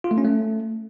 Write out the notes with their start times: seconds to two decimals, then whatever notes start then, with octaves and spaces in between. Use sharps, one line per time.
0.04 F4
0.11 A3
0.18 C#4
0.24 A3